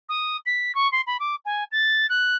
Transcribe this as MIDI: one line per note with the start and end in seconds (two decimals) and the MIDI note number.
0.09 0.37 87
0.46 0.74 95
0.75 0.90 85
0.92 1.01 84
1.07 1.17 83
1.20 1.35 86
1.45 1.64 80
1.71 2.06 93
2.09 2.36 90